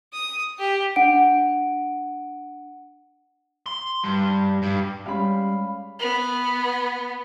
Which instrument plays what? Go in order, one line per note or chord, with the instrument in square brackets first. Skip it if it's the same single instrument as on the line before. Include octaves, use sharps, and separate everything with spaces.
[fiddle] D#6
G4
[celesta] D4 F#5 D7
[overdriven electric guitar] C6
G2
G2
[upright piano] G3 G#3 C#4 [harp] F5 B5
[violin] B3